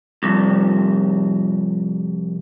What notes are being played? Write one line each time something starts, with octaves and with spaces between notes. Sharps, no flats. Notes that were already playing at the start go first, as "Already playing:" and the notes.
C2 F2